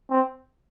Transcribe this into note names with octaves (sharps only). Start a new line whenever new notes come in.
C4